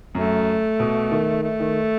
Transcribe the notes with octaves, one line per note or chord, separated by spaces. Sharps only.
F#2 A3
B2
D#3
A3
D#3